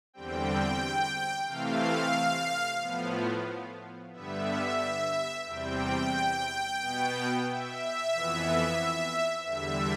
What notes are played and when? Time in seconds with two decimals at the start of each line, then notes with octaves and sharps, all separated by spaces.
0.14 E2 D3 G3 C4 G5
1.47 C3 E3 A3 C4 F5
2.80 A2 F3 B3
4.13 G2 D3 G3 B3 E5
5.46 E2 C3 G3 C4 G5
6.80 B2 B3
7.46 E5
8.12 F2 E3 B3
9.46 E2 D3 G3 E5